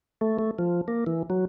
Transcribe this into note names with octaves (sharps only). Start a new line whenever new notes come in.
A3
A3
F3
A#3
E3
F#3